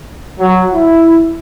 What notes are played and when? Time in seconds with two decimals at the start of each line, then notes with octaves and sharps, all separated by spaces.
0.39 F#3
0.73 E4